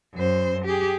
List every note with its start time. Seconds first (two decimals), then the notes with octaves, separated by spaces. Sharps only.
0.14 F#2 C5
0.65 G4 G#4